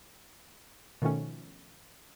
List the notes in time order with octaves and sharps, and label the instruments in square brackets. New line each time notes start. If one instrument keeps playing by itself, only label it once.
[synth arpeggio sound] B2 D#3 F3 A3 C#4